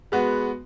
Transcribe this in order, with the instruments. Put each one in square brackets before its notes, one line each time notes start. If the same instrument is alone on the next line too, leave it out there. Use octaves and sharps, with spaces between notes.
[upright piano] G#3 B3 F#4